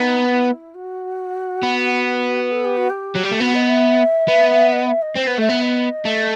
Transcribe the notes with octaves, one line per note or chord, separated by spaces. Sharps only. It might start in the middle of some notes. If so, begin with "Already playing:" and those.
Already playing: B3 D#4
E4
F#4
B3
A4
G4
F#4
G4
F#3
G3
A3
B3 F#4
D#5
E5
B3
D#5
E5
D#5
C4 C5
B3
A3 E5
B3
D#5
A3